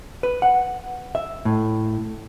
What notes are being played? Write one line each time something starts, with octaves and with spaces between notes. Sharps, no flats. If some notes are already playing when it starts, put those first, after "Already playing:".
B4
F#5
E5
A2